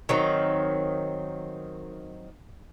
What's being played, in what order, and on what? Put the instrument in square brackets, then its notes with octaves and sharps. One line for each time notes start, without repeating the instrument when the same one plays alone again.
[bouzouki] D#3 F#3 C4